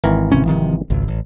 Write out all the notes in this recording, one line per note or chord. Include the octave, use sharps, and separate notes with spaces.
G#1 E3 A#4
C3 C4 C#4
C3 D#3 F3
G#1 C#2
A1